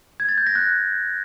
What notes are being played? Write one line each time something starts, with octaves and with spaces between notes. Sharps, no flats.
G#6
A6
G6
A#6
F#6